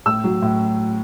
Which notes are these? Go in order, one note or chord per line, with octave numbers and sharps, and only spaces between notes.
A2 E6
F#3
A2